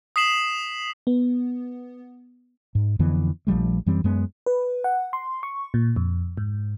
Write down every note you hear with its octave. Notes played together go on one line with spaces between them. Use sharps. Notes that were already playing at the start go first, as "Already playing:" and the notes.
D#6 B6 C7 E7 F#7
B3
G#2
F2 D3 E3 B3
A#1 F3 G3 A3
F#2 E3 G3 C4
F#2 G#3 B3
B4
F#5
C6
C#6
A#2
F2
G#2